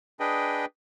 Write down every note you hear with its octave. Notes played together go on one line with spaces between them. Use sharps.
D4 G#4 B4 D#5 G5